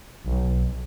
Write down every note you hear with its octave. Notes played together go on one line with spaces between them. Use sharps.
B1